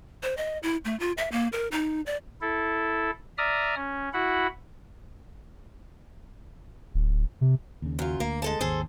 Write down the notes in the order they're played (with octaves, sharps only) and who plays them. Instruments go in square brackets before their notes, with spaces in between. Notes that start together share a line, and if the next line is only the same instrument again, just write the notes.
[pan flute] C5
D#5
E4
A3
F4
E5
A#3
A#4
D#4
D5
[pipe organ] E4 A4
D5 E5 A#5 D#6 F6
C#4
E4 F#4 F#5 B5
[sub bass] D1
C3
[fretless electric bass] D#2 C#3
[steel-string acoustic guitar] F#2 F4
[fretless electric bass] D2 [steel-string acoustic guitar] A#3
[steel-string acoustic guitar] G#3 A4 A5
[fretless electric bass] G#1 D#2 [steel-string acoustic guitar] G#4 A4 C5